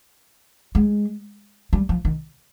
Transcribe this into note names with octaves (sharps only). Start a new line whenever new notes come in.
G#3
G3
F3
D#3